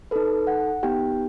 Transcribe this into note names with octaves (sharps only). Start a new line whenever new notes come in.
D#4 A4 B4
F#5
B3 D#4 G4 G5